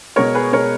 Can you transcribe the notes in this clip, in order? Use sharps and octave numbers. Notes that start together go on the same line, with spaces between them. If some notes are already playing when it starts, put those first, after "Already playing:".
B2 G#3 A#4 C#5
G#4 B4
B2 G#3 A#4 C#5